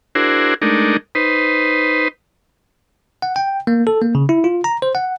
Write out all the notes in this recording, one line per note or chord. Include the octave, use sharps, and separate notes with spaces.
D4 E4 F#4 G#4 A#4 C5
G#3 A3 D4 D#4 A#4
D#4 B4 C5
F#5
G5
A#3
A4
A#3
C#3
E4
F4
A#5
C5
F#5